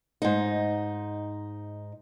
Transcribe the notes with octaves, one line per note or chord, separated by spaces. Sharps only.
G#2 D#4